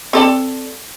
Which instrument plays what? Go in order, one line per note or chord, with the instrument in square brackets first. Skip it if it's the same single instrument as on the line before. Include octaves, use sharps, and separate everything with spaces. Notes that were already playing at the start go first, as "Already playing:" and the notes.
[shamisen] C4 A4 D5